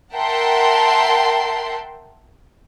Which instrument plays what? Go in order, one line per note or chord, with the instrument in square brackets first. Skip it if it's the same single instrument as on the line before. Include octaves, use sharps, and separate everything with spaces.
[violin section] A#4 E5 F#5 G5 A5 C6